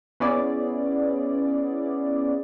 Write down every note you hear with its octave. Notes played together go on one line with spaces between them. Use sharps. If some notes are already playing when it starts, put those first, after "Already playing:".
B3 C#4 E4 G#4 D5